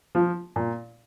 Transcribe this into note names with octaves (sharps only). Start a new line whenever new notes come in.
F3
A#2